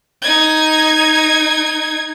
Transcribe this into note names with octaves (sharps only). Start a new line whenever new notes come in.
D#4 G#6